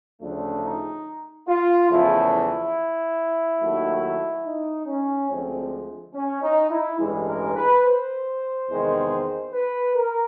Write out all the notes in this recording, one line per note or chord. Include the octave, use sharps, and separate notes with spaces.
D2 C#3 F3 A3 D4
D#4
F4
E2 C#3 F3 A3 E4
E4
D#2 D#3 F#3 A3
D#4
C#4
D2 D3 F3 G#3 C4
C#4
D#4
E4
A1 G2 E3 G#3
A#4
B4
C5
E2 C3 D#3 G#3
B4
A#4